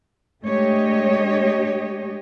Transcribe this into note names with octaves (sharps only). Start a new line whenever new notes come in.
G#3 A3 D4 G4 C#5 D#5